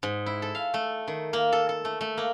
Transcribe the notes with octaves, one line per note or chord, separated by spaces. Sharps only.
G#2
E4
A4
F5
A3
D#3
A#3
A4
A4
A3
A3
A#3